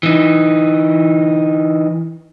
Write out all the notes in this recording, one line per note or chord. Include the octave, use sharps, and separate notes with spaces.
E3 D#4